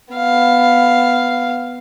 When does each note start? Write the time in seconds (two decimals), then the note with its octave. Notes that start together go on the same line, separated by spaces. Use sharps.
0.14 B3 F5